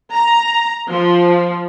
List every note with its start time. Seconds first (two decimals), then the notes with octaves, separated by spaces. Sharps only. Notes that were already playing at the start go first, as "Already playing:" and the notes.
0.13 A#5
0.89 F3